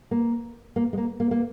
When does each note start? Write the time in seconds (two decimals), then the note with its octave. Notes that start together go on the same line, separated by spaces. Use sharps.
0.11 A#3
0.76 A#3
0.93 G#3
0.98 A#3
1.20 A#3
1.31 A#3